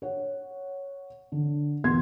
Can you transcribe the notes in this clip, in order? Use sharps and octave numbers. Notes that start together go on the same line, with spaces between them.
C#5 F#5
D3
E2 B2 B3 C6 G#6